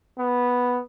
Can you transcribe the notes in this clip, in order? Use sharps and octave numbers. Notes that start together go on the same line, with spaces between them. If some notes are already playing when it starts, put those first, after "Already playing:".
B3